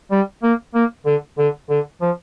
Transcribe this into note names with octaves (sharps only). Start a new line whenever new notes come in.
G3
A#3
A#3
D3
D3
D3
F3